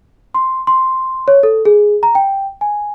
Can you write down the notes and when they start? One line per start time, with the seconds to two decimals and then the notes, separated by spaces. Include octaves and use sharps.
0.34 C6
0.67 C6
1.28 C#5
1.43 A4
1.65 G#4
2.03 A#5
2.15 G5
2.61 G#5